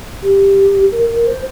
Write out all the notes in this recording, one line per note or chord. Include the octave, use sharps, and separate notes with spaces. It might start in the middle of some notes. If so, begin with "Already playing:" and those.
G4
A#4
A#4
C5